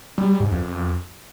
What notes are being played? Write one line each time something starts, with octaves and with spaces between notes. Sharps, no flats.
G3
G3
G#2
F2
F2